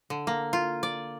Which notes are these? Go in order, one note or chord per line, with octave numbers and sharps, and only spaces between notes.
D3
A#3
F4
D5